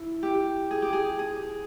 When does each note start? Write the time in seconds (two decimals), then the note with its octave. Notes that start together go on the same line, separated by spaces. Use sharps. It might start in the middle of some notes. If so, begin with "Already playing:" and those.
Already playing: E4
0.23 G4
0.71 G#4
0.82 G4
0.93 G#4
1.19 G#4